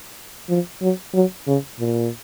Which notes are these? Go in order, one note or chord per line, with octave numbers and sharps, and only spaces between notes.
F3
F#3
F#3
C#3
A#2